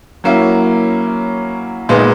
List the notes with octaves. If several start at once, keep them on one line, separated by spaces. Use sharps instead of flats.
F#3 A#3 C#4 E4
A#2 G#3 B3 D#4